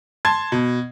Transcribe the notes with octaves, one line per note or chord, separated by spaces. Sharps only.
A5 C6 G#6
B2